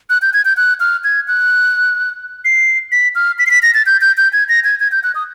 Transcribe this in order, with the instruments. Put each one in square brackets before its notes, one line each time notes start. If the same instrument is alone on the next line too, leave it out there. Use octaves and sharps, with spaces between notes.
[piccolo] F#6
G6
G#6
G6
F#6
F6
G#6
F#6
C7
B6
F6
B6
C7
B6
A#6
A6
G6
G6
G6
G#6
A#6
G#6
G#6
G6
F#6
D#6